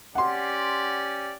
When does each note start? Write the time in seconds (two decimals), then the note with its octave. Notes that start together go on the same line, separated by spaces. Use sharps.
0.15 C#4 G4 D5 F#5 C6